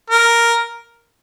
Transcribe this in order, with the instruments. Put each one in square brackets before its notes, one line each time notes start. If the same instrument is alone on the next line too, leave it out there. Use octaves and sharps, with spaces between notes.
[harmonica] A#4